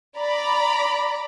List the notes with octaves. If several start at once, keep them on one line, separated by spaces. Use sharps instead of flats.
D5 A#5 B5